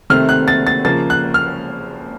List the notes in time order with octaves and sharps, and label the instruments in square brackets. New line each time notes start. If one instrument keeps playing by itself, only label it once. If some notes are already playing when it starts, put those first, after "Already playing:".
[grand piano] C3 D#3 A3 C4 F6
F#6
A6
A6
C#3 F3 A#3 A6
F#6
F6